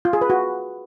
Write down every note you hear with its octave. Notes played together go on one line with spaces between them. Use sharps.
F4
G#4
B4
F#4